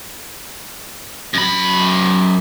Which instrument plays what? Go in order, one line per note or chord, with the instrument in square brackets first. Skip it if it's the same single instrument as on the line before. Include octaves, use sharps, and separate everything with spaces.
[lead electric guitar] F#2 B5